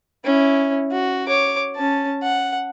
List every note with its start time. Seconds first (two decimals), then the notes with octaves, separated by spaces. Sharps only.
0.25 C#4 E4
0.91 F#4
1.28 C#5 D6
1.76 C#4 A5
2.23 F#5